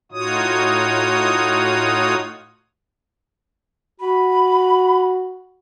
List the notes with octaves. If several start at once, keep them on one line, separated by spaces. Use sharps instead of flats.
A2 D#4 F4 F#4 C#5 D#6
F#4 B5